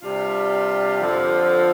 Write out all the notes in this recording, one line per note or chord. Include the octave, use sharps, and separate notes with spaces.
C3 G3 D4 F4
F2 D3 F3